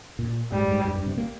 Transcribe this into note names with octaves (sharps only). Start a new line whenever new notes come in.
A#2
G#2 G3
G#2
G2
G2
C3
A#3